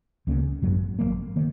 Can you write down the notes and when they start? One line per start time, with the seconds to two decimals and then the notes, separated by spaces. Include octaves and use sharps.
0.27 C#2 C#3 A#3 C#4
0.62 G#1 F#2 F#3 A#3
0.99 G#1 F#2 F#3 A#3
1.36 D#3 A#3